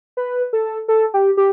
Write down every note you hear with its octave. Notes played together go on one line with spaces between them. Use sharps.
B4
A4
A4
G4
G4